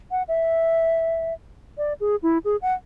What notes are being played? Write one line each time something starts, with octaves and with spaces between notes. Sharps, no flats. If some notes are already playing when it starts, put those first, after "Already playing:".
F#5
E5
D5
G#4
E4
G#4
F#5